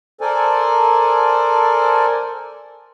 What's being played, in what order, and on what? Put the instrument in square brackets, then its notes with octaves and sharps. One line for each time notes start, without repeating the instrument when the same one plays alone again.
[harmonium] A4 A#4 C5 D5 G#5